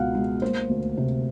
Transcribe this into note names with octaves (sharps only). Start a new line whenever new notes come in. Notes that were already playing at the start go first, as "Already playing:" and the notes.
Already playing: C#2 B2 F5 F#5
G#3
A#3 C5
D2
C3